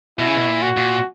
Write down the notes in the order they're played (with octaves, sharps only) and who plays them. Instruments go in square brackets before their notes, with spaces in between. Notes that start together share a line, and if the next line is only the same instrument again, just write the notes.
[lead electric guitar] B2 [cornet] E4
[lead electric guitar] C#3
B2
A#2
[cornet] F#4
[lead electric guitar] A#2